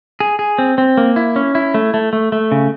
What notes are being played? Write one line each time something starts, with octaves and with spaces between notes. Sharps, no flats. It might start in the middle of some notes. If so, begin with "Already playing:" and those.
G#4
G#4
C4
C4
A#3
E4
C#4
E4
A3
A3
A3
A3
C#3